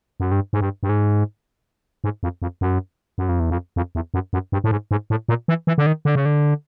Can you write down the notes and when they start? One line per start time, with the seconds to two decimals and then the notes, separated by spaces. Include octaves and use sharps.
0.20 F#2
0.32 G2
0.53 G#2
0.61 G2
0.83 G2
0.89 G#2
2.04 G#2
2.23 F2
2.42 F2
2.61 F#2
3.18 F#2
3.29 F2
3.40 E2
3.50 F2
3.76 F2
3.95 E2
4.14 F#2
4.33 F#2
4.52 G2
4.64 A2
4.71 G#2
4.91 G#2
5.10 A2
5.29 A#2
5.48 E3
5.67 E3
5.78 D3
5.86 D#3
6.05 D3
6.15 C#3
6.25 D3